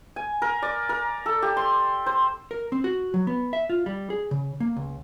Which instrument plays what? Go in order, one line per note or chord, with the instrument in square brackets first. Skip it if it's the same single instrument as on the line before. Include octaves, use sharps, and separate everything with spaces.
[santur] G#5
A#4
D5
A#4
A4
G4
C6
C5
[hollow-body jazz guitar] A#4
C4
F#4
F#3
B3
E5
F4
G3
G#4
C#3
A#3
C#2